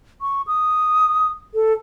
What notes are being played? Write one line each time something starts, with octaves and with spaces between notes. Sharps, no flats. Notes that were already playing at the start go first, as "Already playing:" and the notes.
C#6
D#6
A4